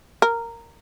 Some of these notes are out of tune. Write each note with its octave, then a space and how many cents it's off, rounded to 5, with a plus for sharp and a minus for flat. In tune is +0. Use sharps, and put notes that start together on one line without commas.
A#4 -10